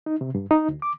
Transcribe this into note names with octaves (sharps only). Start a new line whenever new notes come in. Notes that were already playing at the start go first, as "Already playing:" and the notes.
D#4
C3
G2
D#4
D2
D6